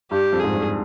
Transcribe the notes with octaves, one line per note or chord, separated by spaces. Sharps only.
G2 G4
F2
G#2 G#4
G2